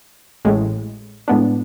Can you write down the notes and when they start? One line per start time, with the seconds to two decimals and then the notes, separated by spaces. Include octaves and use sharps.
0.45 A1 A2 G#3
1.28 A2 G#3 B3 D4